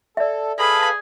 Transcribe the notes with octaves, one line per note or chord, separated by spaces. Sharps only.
A4 D5 E5
G#4 A4 B4 F5 B5